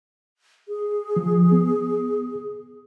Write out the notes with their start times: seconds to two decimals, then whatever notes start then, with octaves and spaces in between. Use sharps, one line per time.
0.68 G#4
1.16 F3
1.52 B3